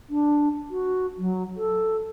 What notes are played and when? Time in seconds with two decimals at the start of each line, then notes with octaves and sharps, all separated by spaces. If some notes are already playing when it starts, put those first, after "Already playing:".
0.10 D4
0.70 F#4
1.18 F#3
1.56 A4